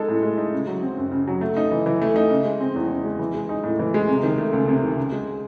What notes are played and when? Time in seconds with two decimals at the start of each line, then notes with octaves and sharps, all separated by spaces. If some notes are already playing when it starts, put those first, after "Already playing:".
Already playing: G#3 D#4 A4
0.09 A2
0.23 G#3
0.38 D#4
0.53 C#3
0.67 F#3
0.82 C4
0.98 F#2
1.11 C#3
1.27 F#3
1.41 A3
1.57 D#4
1.71 E3
1.86 E3
2.02 A3
2.16 D#4
2.30 C#3
2.45 G#3
2.60 C4
2.76 E2
2.90 C#3
3.04 G#3
3.19 E3
3.34 G#3
3.49 D#4
3.64 A2
3.79 E3
3.94 G#3
4.09 C3
4.23 D#3
4.38 A3
4.53 C#2
4.68 C3
4.83 D#3
4.97 C#3
5.12 G#3